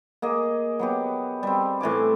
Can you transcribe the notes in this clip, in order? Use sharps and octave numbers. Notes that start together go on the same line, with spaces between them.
A#3 G#4 D#5
F#3 B3 G4
G3 C4
A2 E3 G#5 D6